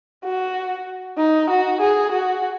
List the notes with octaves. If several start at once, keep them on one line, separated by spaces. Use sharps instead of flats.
F#4
D#4
F#4
G#4
F#4